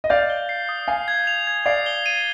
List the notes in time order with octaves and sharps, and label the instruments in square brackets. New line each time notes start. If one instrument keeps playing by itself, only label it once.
[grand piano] D#5
[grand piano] D5 F5 [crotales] G6
[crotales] G7
C7
D#6
[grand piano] F5 G#5 [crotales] C7
[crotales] G#6
F7
G#6
[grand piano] D5 F5 [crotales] C7
[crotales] G7
D#7